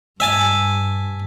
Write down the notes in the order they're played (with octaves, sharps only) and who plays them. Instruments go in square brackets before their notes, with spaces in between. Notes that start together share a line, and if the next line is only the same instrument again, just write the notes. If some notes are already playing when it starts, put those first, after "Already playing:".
[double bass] G2 [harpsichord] E5 G#5 A5